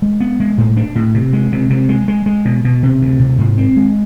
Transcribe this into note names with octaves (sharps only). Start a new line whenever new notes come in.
G#3
B3
G#3
A2
D4
A2
C3
G#3
C3
C3
G#3
G#3
G#3
B2
B2
C3
D2
C3
G#2
C4
G#3